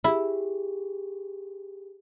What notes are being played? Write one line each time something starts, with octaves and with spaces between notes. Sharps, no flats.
E4 G4 G#4